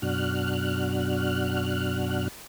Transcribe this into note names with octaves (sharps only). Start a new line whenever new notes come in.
F#2 B2 D4 F#4 F6 F#6